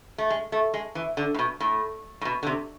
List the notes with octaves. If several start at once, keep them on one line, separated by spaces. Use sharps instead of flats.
A3
G#3
A3
G#3
E3
D3
A2
B2
A2
A2
B2
D3
C3